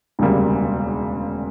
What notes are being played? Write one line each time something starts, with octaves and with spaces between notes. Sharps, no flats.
E1 D2 C#3 G3 A#3